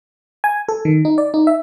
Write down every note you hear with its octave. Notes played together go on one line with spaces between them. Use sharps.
G#5
A4
D#3
D#4
D5
D#4
E5